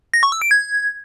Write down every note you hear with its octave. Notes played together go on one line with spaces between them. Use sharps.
A#6
C#6
E6
D7
G#6